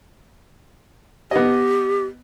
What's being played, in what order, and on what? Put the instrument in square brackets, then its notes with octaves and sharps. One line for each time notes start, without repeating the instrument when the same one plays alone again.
[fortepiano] B3 D#5 [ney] G4